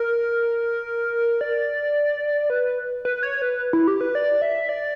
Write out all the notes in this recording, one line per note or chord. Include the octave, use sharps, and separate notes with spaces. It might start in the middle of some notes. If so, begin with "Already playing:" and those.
Already playing: A#4
D5
B4
B4
C#5
B4
E4
G4
B4
D5
E5
D5